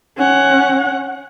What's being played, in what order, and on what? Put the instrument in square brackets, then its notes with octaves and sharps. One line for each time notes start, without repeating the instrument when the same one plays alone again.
[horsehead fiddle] C#4 F#5